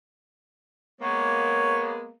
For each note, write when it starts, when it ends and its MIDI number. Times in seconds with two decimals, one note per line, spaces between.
1.01 2.11 56
1.01 2.11 58
1.01 2.11 59
1.01 1.95 73